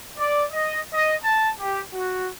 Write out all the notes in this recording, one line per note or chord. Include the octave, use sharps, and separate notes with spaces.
D5
D#5
D#5
A5
G4
F#4